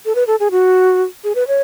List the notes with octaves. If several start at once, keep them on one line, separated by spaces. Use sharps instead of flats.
A4
B4
A4
G#4
F#4
G#4
B4
C#5